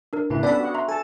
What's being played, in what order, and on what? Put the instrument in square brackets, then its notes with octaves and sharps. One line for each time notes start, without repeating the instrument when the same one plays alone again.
[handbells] D4 A#4
[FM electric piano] A2 C#3 E4 [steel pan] B4
[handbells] B3 C#4 B6 [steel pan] D4 A4 B4 [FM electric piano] D5 B5
[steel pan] F#4 F#5
[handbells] E5 A#5 C6
[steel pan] A4 A5 [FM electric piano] G#5